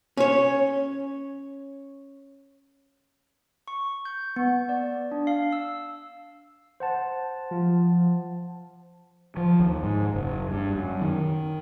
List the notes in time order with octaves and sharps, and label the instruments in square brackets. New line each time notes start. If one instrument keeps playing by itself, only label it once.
[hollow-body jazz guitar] C#4 C#5
[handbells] C#6
G6
B3
D5
D4
F5
E6
[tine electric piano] C5 F#5 A5
[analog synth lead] F3
[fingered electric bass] F3
D#2
G#2
F#1
G2
F#2
D#3